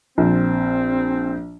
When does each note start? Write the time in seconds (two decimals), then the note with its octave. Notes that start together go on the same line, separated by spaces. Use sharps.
0.18 A#1 C4